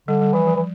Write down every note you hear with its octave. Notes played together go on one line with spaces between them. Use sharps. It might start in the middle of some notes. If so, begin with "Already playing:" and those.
D3 G3
G3
E3 F3
F3
E3